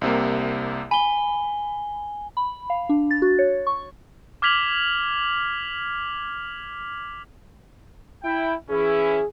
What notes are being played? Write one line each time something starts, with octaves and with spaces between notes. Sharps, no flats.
C2 C3 A#3
G#5 B5 G7
B5
F5
D4
A6
F#4
C#5
C#6
D6 F6 G#6 B6 F7 F#7
E4 G5
E3 C#4 E4 G#4